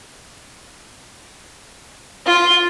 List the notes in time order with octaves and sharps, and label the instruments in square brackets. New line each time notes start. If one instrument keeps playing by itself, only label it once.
[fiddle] F4